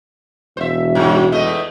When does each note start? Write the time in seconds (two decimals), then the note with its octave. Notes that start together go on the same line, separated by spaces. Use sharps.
0.57 E1 C5 E5
0.95 G2 F#3
1.32 E2 A3 D#5